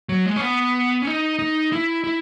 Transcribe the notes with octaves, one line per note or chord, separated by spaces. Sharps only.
F#3
G#3
C#4
B3
C#4
D#4
D#4
E4
E4